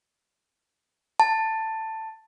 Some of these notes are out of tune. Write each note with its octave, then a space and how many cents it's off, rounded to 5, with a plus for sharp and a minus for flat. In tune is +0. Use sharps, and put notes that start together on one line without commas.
A5 +10